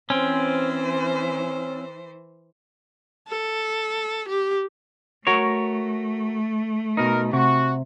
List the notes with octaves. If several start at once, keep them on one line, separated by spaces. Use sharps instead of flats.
E3 C4 C#4 C5
A4
G4
A3 F#4 A#4 C#5
B2 D#4 A#4
C3 F#4 C#6